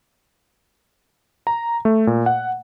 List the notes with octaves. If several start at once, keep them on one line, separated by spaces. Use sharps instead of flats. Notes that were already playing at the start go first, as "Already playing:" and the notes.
A#5
A3
A#2
F#5